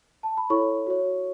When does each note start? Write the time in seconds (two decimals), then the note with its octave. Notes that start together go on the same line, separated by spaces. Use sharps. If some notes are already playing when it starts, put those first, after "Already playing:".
0.23 A5
0.37 B5
0.50 E4 A4 C#5 C#6
0.87 F#4 C#5